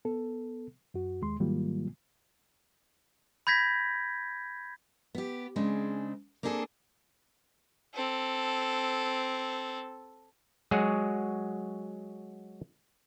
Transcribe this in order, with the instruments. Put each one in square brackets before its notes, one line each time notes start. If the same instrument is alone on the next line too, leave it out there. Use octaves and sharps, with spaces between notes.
[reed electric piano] B3 A4
F#2 F#4
D#2 G#3 C6
G#2 D#3 F#3 G3 A#3 F4
[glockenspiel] B5 G6 G#6 A#6 B6
[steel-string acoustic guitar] B3 G4
C#3 G#3 C4 D4
A#3 C4 D4 G#4 A4
[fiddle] C4 A4
[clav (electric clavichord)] F#3 G#3 F#4 G#4